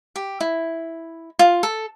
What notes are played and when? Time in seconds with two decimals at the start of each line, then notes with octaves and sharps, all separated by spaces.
0.16 G4
0.40 E4
1.39 F4
1.63 A4